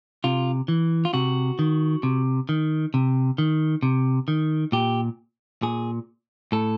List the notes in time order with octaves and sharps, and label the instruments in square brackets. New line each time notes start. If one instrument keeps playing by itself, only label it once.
[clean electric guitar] C3 F4
E3
F4
C3 F#4
D#3
C3
D#3
C3
D#3
C3
D#3
A#2 G4
A#2 G#4
A2 A4